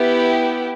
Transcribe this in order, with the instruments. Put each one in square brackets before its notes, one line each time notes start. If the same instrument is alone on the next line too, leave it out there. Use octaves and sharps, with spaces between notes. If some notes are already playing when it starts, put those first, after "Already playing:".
Already playing: [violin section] B3 E4 G4